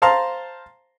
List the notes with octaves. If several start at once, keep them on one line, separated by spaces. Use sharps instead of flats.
C5 F5 A5 A#5 C6